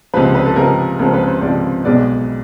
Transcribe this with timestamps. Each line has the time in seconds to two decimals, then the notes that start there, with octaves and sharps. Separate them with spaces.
0.14 C#2 C3 F3 B4
0.35 B4
0.46 A4
0.56 C#2 C3 F3 A#4
0.99 C#2 C3 F3 A#4
1.14 B4
1.28 C5
1.42 C#2 C3 F3 D5
1.85 B1 B2 G#3 B3 D5